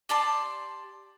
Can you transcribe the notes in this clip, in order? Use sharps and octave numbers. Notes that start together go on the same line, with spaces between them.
G4 D5 A5 C6